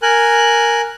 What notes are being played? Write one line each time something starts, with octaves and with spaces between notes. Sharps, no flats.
A#4 G#5 F#6